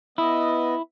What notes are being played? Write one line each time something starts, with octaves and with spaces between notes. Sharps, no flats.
B3 E4 D#5